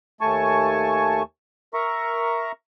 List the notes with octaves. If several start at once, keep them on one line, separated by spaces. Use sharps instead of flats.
D#2 A3 G#5 A5 C#6
A#4 E5 A#5 C#6